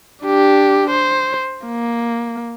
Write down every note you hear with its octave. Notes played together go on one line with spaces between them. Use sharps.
D4 G4
C5
A#3